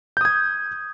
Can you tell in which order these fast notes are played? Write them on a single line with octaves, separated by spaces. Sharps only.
G6 D#6 G#6